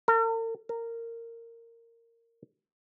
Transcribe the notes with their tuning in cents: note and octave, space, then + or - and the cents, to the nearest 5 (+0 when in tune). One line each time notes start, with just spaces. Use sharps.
A#4 -45
A#4 -15